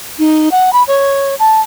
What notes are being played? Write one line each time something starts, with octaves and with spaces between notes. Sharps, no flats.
D#4
F#5
B5
C#5
A5